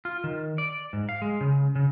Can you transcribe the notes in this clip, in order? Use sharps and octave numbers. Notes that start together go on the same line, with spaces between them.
F4
D#3
D5
G#2
F5
G#3
C#3
C#3